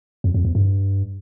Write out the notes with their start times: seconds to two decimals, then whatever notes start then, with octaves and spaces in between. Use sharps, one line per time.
0.24 F2
0.34 F2
0.45 E2
0.55 G2